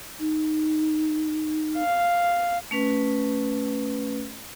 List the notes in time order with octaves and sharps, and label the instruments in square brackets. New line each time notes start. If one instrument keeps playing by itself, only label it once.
[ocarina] D#4
[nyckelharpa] F5
[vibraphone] A3 C#4 B4